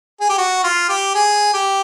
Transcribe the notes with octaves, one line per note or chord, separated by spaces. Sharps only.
G#4
G4
F#4
F4
G4
G#4
G4